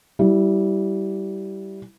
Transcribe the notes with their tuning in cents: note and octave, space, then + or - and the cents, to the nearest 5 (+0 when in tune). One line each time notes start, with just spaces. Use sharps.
G3 -15 E4 +0